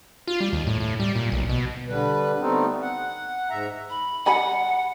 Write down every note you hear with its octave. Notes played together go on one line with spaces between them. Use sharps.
F4
G3
D#2
A2
A2
G3
A#2
B1
B2
D3 G3 B4
G3 A3 B3 C4 D#4
F#5
G#2 E5 A#5
B5
G3 F#5 G#5 B5